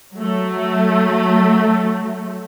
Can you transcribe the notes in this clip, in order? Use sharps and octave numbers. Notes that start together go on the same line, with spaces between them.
F#3 A3